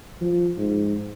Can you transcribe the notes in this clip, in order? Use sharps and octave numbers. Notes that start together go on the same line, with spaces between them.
F3
G#2